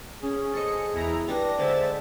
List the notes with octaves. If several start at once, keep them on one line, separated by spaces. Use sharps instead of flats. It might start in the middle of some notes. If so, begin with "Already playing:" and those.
C#4 G#4
A4 C5 D#5 C#7
E2 E4 A#5
G3 D4 B4 A#6
D3 G#3 C5 E5 A5 A6